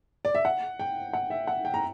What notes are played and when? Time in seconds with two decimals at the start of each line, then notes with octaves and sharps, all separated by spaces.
0.25 D5
0.35 E5
0.45 F#5
0.79 G5
1.13 F#5
1.30 E5
1.47 F#5
1.65 G5
1.74 A#5